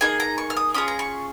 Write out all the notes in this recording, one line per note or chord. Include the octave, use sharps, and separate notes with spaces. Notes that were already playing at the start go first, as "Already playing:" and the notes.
A#3 D#4 G#4 G#5
A#5
C#6
F6
D#6
C#4 F4 G#4 D#6
A#5
C#6